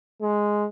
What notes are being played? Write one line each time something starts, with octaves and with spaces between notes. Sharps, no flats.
G#3